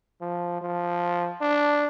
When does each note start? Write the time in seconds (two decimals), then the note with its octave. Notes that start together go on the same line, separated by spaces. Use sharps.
0.21 F3
0.62 F3
1.41 D4